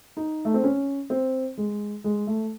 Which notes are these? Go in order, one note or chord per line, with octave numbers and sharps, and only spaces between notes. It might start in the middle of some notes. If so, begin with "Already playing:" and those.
D#4
A3
C4
C#4
C4
G#3
G#3
A3